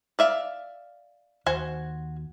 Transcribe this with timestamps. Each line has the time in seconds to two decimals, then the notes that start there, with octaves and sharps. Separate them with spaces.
0.19 D5 E5 F5
1.46 D#2 F#4 C5 G#5